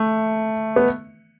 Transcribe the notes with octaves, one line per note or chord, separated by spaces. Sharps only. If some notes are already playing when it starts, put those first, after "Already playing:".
Already playing: A3
B3